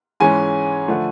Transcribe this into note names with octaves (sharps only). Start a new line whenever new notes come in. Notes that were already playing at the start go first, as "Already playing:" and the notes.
G#2 E3 G#3 C#4 G#5
D3 F3 A3